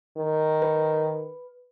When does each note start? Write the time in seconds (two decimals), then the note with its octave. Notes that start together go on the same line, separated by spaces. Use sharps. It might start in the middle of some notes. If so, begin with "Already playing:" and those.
0.16 D#3
0.62 B4